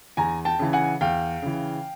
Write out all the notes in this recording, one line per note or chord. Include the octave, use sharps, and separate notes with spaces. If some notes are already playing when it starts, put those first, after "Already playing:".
E2 G#5 A#5
G5 A5
C#3 E3
F#5 G#5
E2 F5 G5
C#3 E3